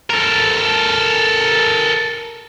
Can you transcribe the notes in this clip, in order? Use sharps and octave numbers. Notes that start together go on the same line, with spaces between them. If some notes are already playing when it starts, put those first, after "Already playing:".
A4 A#4